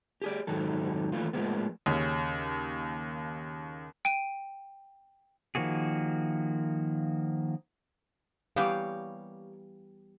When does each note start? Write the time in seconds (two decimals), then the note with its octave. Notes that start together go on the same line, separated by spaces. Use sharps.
0.22 G4 G#4 D5
0.47 F2 G#2 D#3 F#3 A4
1.12 D#2 E3 A3 F4
1.33 A2 F3 G#3 A#3 B3
1.86 D#2 C#3 C#4
4.05 G5 D#7
5.55 D#3 F3 A#3 F#4 G#4
8.56 E3 G3 A#3 B3 G4 C#5 F5